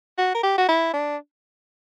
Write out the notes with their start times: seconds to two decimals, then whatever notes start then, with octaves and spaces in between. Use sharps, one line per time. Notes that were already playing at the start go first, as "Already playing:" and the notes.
0.18 F#4
0.35 A#4
0.43 G4
0.58 F#4
0.69 E4
0.94 D4